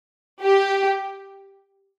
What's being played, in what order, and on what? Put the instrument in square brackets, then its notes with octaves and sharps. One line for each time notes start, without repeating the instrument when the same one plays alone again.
[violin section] G4